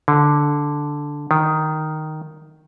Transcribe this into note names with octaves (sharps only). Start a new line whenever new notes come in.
D3
D#3